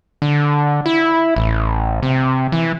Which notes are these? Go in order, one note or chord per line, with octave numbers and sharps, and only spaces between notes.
D3
E4
A1
C3
E3